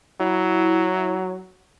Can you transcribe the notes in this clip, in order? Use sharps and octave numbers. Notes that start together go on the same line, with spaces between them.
F#3 E4